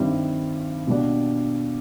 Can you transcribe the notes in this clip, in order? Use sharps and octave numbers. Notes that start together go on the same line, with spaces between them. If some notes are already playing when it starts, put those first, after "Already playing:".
Already playing: G2 D#3 G3 C4 E4
B2 G3 A#3 D4